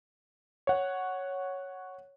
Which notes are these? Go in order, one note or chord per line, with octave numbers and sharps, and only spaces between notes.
C#5 F#5